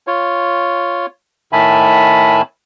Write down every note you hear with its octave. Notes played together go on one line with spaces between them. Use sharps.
F4 C#5
A2 D#3 E5 G#5 A5 B5